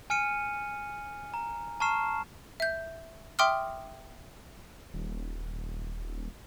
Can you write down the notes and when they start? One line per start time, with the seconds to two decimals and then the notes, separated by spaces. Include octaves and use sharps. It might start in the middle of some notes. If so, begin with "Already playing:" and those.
0.10 G#5 F6 C#7 D#7
1.34 A#5
1.80 A5 A#5 C#6 F6 C7 E7
2.60 E5 G6
3.39 E5 G5 C6 D6 D#6 F6
4.94 D#1